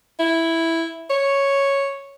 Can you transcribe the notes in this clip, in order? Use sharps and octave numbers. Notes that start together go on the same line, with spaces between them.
E4
C#5